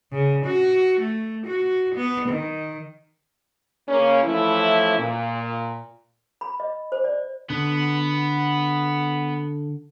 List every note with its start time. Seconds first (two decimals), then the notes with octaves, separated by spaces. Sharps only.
0.12 C#3
0.45 F#4
1.00 A3
1.46 F#4
1.95 B3
2.28 D#3
3.88 C#3 A#3 C#4
4.24 E3 F3 A3 C#4 E4
4.99 A#2
6.41 B5
6.60 D#5
6.92 C5
7.04 D5
7.50 D3 B3